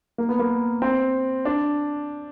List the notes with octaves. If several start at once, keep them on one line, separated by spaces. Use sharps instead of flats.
A#3
B3
A#3
C4
D4